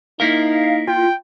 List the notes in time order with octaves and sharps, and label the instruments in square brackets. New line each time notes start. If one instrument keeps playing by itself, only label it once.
[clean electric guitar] A#3 E4 A#4 [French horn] D#4 [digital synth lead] F5
[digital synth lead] F4 [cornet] G5